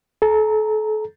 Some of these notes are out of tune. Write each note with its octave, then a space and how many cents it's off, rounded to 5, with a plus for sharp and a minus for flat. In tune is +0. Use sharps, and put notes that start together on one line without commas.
A4 -35 A#5 +0